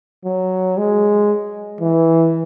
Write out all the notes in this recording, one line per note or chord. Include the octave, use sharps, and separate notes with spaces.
F#3
G#3
E3